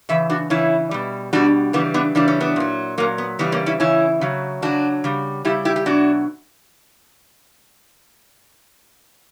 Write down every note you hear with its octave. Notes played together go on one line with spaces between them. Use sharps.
C#3 E3 E5
D4 F#4
C#3 E3 C#4 E4
B2 G3
B2 G3 D4 F#4
C#3 E3 G3 B3 D4
B3 D4
C#3 E3 G3 D4
C#4
B3 D4
A#2 F#3
A#2 F#3 A#3 C#4
B3
C#3 E3 G3 B3
A#3 C#4
C#4 E4
C#3 E3 C#4 E4
C#3 F#3
C#3 F#3 D4 F#4
C#3 G3
C#3 G3 E4 G4
E4 G4
G4
B2 F#3 D4 F#4